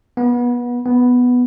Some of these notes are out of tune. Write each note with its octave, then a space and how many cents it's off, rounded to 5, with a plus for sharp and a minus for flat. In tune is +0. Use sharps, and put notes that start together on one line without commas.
B3 -25
B3 +0